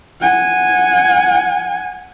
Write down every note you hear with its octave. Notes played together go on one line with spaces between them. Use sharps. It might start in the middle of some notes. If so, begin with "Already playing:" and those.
F#5 G#5